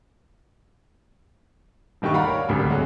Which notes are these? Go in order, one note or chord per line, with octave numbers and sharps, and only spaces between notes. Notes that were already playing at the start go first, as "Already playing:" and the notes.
D#1 G2 D#3 A3 G4 C#6
D5 F5 F#5 A#5 B5
A#4 C#5
D1 G#1 D2 D3 G3
C3 F#3 G#3